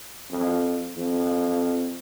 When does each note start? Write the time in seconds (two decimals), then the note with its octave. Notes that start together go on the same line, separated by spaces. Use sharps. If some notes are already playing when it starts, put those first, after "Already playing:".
0.31 F2
0.96 F2